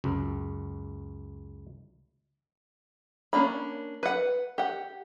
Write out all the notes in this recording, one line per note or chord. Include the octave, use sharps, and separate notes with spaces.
C#2 F#2
A#3 C#4 D4 B5
B4 F#5
G4 F#5